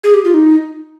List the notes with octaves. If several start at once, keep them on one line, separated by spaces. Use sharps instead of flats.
G#4
G4
F4
D#4